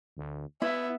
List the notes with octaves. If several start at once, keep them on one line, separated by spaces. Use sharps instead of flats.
D2
B3 E4 E5